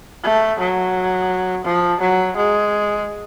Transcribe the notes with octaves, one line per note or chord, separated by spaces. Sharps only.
A3
F#3
F3
F#3
G#3